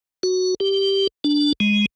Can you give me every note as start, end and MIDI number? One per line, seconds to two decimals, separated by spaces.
0.23 0.55 66
0.60 1.07 67
1.24 1.53 62
1.60 1.86 56